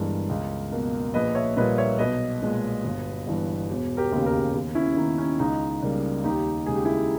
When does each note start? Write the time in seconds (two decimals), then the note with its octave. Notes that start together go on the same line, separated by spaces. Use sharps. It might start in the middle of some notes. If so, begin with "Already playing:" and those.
Already playing: G1 G2 E3 G#3 A#4
0.29 C#2
0.71 B2 A#3
1.14 A#1 B4 D#5
1.35 C#5 E5
1.57 A#2 G3 A#3 B4 D#5
1.77 C#5 E5
1.99 B1 B4 D#5
2.42 A#2 G#3
2.84 G1
3.27 G2 E3
3.70 E1
3.97 G4 A#4
4.12 D#2 C#3
4.26 G4 A#4
4.54 D#2
4.75 C#4 E4
4.96 D#3 A#3 D#4
5.18 C#4
5.39 C#2 D#4
5.82 C#3 G3 A#3
6.24 D#2 D#4 G4
6.66 C#3 G#3 G#4
6.76 G4
6.85 E4 G#4